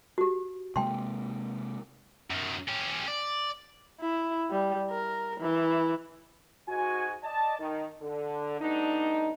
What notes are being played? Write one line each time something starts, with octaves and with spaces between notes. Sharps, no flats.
F#4 G4
C3 G#3 A#3 G5 C6
F#2 D#3
C#4 G4
D5
E4
G3
A#4
E3
G#2 F#4 G#5
D5 D#5 A5
D#3
D3
G3 A3 B3 D4 D#4